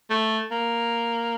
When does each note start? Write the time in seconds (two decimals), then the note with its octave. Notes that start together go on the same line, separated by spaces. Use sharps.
0.10 A3
0.51 A#3